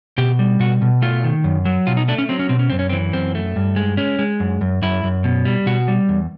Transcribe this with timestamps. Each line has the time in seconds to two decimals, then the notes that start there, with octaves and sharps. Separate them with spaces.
0.18 B2 G4
0.39 G3
0.60 B2 F#4
0.82 B2
1.02 A3 F4
1.24 D#3
1.44 F#2
1.65 F#3
1.87 B2 F4
1.97 D#4
2.08 A3 D4
2.18 C#4
2.29 F#3 C4
2.39 C#4
2.49 B2 C4
2.59 C#4
2.70 F#2 C4
2.79 C#4
2.90 C4
2.93 E3
3.13 F#2 C4
3.35 A3
3.56 G2
3.76 G#3
3.97 G#3 C#4
4.19 G#3
4.40 F#2
4.61 F#2
4.82 F#2 E4
5.03 F#2
5.24 B2
5.45 G3
5.66 B2 F#4
5.88 G3
6.09 E2